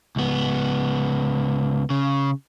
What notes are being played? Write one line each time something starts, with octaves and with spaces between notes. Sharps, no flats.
C#2 B3
C#3